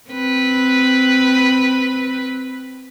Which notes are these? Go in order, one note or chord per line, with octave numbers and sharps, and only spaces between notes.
C4 B4